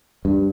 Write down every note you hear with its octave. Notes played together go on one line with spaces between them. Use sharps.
G2